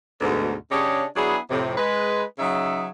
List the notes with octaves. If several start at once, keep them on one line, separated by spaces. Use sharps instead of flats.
D2 G#2 B2
C#3 D4 G4 G#4 C#5 D#5
F#3 B3 D4 E4 G#4
F2 A2 C3
G#3 B4
C#3 F#3 D#4 G#4 E5